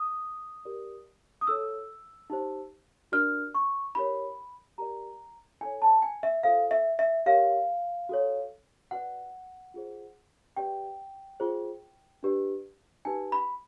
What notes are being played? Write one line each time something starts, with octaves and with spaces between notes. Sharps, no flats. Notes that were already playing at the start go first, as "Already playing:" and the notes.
Already playing: D#6
G4 A#4 D5
D#6
E4 A4 C#5 E6
D#4 G4 C5
D4 F#4 A#4 D5 F6
C#6
E4 G4 A#4 C#5 B5
G4 A#4 D5 A#5
E4 A4 C#5 G#5
A5
G#5
E5
F4 A4 C5 F5
E5
E5
G4 A#4 C#5 F5
F#4 A4 C#5
F#4 B4 D5 F#5
F4 G#4 C5
G4 B4 D5 G5
F4 G#4 C5
D4 G4 B4 D5
D#4 G4 B4 G#5
B5